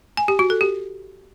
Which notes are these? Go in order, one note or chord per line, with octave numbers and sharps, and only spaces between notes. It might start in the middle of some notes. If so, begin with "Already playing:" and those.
G#5
G4
F#4
A4
G4